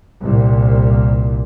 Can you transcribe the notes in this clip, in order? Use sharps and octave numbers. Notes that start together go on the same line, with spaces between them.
C2 A#2